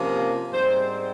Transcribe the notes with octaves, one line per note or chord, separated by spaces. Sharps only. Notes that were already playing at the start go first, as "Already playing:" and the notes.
Already playing: C3 F3 A#3 C#4
G#2 G3 C4 C5